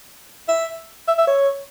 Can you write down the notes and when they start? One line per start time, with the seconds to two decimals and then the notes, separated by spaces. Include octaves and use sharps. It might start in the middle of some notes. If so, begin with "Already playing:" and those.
0.49 E5
1.08 E5
1.18 E5
1.27 C#5